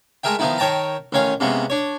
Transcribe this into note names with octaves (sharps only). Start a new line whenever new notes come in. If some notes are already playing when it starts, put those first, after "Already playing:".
G#3 A3 G#4 A#4 E5 G5
D#3 F3 B3 D#4 E4
D#3 C#5 G5 A5 A#5
A1 D#3 C#4 C#5 F5
C3 G#3 A#3 B3 C#4
D4 C#5